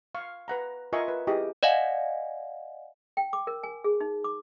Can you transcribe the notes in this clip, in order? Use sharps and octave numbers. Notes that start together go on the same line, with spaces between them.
F5 C#6
B4 F#5 A#5
F4 A#4 D#5 E5 G#5 C#6
B4
E4 G4 G#4 D#5
D5 D#5 F5 F#5 G#5
G5
D6
A#4
G#5
G#4
D#4
D6